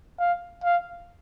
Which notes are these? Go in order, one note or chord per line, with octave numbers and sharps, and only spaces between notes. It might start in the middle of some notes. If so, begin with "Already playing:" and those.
F5
F5